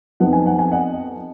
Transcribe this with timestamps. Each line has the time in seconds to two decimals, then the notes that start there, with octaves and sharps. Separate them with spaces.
0.20 F2 F3 B3 D#4 F#5
0.33 G#5
0.46 F#5
0.59 G#5
0.72 D#5 F#5